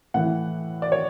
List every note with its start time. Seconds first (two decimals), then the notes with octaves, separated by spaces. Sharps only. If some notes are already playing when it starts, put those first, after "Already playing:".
0.14 A2 E3 F#5
0.82 D5
0.92 C#5